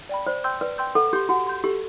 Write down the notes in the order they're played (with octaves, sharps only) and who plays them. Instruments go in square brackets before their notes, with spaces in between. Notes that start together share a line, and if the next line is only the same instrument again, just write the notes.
[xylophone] D5 G5 B5
[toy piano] C5 [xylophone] D5
[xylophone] G5 C6 E6 G6
[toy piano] B4 [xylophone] D5
[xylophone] G5 C6 E6 G6
[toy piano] A4 [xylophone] F#5
[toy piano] G4 [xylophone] C6 G6
[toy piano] F#4 [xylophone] F#5
[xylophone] C6 G6
[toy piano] G4 [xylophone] A4